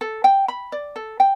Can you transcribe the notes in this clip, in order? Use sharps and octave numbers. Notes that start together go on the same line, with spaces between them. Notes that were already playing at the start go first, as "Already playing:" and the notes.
A4
G5
B5
D5
A4
G5